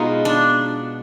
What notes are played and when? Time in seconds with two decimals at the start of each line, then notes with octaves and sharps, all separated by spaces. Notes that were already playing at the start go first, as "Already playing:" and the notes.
Already playing: B2 G#3 B3 D#4 F4
0.25 D4